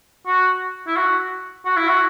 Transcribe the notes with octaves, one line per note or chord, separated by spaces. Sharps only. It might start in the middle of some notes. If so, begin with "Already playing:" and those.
F#4
E4
F#4
F#4
E4
F#4